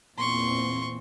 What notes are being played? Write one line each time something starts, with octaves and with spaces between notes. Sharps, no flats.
E2 A#2 C4 C6 C#6